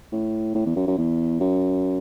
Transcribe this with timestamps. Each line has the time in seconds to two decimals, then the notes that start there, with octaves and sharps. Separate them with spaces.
0.12 A2
0.55 A2
0.66 E2
0.76 F#2
0.87 F#2
0.98 E2
1.40 F#2